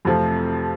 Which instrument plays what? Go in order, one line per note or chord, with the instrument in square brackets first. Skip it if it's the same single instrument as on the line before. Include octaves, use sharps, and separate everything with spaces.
[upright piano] F2 C3 F3 A3